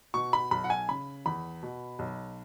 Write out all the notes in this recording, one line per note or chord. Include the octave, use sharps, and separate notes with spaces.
B2 C#6
B5
B1 B5
F#5
G#5
C#3 B5
E2 B5
B2
B1